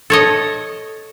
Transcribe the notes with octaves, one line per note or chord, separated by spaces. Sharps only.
A4 C#5 D#5